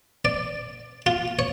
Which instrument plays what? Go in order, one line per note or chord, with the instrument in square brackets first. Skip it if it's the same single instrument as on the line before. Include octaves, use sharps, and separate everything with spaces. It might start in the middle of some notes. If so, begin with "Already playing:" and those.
[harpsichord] D5
F4
C#5